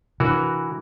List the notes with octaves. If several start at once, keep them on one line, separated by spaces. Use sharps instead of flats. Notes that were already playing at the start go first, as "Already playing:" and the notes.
C3 E3 D4 F#4 A#4